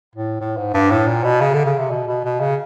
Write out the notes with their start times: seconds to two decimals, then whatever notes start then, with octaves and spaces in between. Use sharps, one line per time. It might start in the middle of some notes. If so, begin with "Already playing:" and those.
0.15 A2
0.40 A2
0.57 G#2
0.74 G2
0.91 A2
1.07 A#2
1.24 B2
1.41 C#3
1.54 D3
1.66 C#3
1.78 C3
1.91 B2
2.07 B2
2.24 B2
2.40 C#3